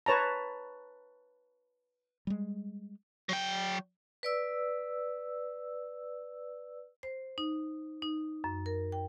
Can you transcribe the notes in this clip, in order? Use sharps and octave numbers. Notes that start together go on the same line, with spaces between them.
B4 C#5 A5 A#5
G3 G#3
F#3 G5
B4 D5 E6
C5
D#4
D#4
F#2
A#4
G5